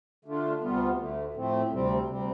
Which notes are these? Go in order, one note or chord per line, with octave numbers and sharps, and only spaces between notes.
D3 A3 D4 F4
D2 C3 G3 B3 F4
D2 D3 A3
A2 F3 A3 C4
D2 C3 G3 C4
D2 C3 G3 C4